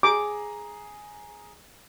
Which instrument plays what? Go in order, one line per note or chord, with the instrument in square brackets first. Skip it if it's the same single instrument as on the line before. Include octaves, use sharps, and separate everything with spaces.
[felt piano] G#4 A#5 [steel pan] D6